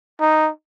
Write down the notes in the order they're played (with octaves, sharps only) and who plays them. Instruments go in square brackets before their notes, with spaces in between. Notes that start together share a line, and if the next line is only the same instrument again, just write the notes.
[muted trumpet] D#4